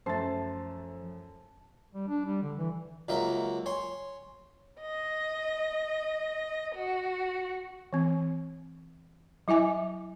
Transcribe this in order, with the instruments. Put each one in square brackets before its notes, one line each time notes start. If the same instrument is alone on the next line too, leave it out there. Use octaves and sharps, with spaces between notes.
[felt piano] F#2 A3 A6 [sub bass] F3 [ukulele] C5 [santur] A5
[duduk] G3
D4
G3
D3
E3
[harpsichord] C#2 F#3 A#3 D#4 E5
C#5 G#5 C6
[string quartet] D#5
F#4
[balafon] E3 C4
F#3 E4 E5 G#5 D6